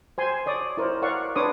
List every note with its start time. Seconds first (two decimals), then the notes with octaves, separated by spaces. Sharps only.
0.18 C5 G#5 C6
0.46 C#5 D5 D#6
0.77 E4 A#4 C5 C#5
1.02 A#4 C#5 D5 F5 F#5 C#6
1.35 D4 B4 C#5 C6 D6 D#6